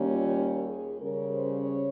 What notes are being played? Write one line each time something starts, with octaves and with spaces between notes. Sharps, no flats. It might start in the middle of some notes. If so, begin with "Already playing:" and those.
Already playing: D#2 D#3 G3 A#3 C#4
F4
G4
G#4
C#3 G3 C#4 A#4
C5
C#5